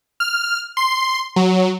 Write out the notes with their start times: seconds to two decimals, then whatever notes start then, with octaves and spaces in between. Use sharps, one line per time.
0.20 F6
0.77 C6
1.36 F#3